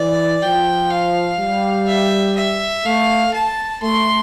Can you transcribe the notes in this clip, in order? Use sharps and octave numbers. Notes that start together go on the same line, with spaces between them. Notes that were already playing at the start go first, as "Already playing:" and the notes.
Already playing: E3 D5
F3 G5
F5
G3
E5
E5
A3 F5
A5
A3 C6